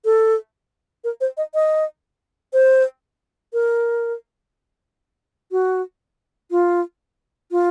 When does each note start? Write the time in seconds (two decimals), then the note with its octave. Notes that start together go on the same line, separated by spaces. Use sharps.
0.05 A4
1.04 A#4
1.21 C5
1.37 D#5
1.54 D#5
2.53 C5
3.53 A#4
5.52 F#4
6.51 F4
7.51 F4